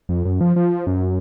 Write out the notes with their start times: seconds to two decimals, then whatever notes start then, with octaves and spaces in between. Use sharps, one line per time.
0.09 F2
0.25 F#2
0.41 F3
0.56 F3
0.87 F#2